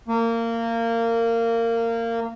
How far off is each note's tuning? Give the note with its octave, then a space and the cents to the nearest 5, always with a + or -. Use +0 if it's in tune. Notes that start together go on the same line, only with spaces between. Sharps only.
A#3 -20